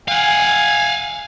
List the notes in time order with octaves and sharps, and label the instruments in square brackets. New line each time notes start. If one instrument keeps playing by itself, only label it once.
[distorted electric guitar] F5 F#5 [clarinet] G#5